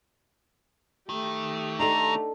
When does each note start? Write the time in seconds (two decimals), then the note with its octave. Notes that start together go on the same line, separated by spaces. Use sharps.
1.09 D#3 A3 G4
1.80 D4 D#4 A4 A#5